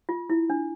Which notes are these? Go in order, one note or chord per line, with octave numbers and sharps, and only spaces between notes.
F4
E4
D4